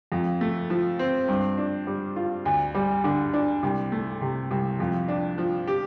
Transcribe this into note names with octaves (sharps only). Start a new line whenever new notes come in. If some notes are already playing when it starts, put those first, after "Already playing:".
F2
A3
F3
C4
G2
D4
G3
F4
D2
G3
D3
D4
C2
A3
C3
C2
F2
D4
F3
G4